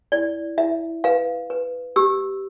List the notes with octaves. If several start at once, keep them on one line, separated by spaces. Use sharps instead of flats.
E4 D5
E4 E5
B4 F5
B4
G4 E6